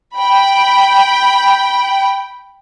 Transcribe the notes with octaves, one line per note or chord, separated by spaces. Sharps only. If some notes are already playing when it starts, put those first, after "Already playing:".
G5 B5